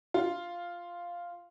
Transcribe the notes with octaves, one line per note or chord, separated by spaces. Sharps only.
F4